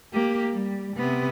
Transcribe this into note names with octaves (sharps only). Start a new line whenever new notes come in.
A#3 G4
G3
C3 B3